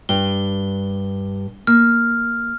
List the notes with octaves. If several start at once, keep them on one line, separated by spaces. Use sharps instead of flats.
G2 G7
A#3 F6